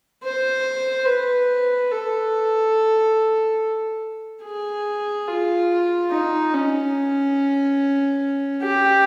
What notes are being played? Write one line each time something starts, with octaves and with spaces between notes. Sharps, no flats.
C5
B4
A4
G#4
F4
D#4
C#4
G4